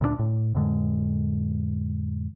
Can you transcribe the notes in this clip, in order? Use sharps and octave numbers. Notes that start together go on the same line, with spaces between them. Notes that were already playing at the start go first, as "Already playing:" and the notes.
D2 A#2 A3 D4
A2
F2 A2 D3 G#3